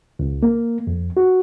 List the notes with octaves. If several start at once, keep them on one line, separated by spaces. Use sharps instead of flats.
C#2
A#3
F2
F#4